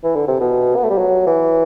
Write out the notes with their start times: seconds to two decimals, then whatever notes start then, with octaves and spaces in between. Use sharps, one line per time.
0.04 E3
0.16 D3
0.28 C3
0.40 B2
0.76 B3
0.84 A3
0.90 G3
0.98 F#3
1.27 E3